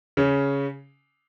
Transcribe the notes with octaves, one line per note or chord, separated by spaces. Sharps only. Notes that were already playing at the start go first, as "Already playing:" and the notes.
C#3 C#4